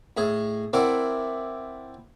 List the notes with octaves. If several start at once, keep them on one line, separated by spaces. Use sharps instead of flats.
A2 G#4 D#5
C4 E4 A#4 D5 F#5 D6